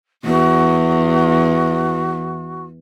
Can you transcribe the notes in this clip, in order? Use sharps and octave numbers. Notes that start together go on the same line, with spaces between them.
E2 F#4